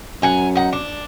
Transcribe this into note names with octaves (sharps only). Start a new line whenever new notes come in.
F#2 F#5 G#5 A#5
D#4 F#5
D4